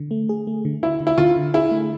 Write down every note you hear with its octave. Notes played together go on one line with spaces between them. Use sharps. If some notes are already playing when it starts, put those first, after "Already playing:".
Already playing: D3
A3
G#4
A3
D3
D3 E4
D3
E4
D3 F4
D3
E4 G#4
A3